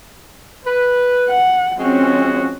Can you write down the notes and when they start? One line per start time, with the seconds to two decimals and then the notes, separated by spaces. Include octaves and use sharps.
0.66 B4
1.29 F#5
1.78 F3 G#3 C4 C#4 F#4